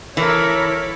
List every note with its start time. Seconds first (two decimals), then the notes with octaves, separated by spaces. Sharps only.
0.17 E3 A4 A#4 C#5 B5